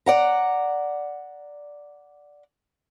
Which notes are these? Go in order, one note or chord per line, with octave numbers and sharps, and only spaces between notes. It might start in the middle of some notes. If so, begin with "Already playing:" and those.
D5 F#5 A#5